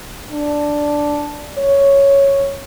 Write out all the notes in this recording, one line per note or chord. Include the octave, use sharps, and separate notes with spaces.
D4
C#5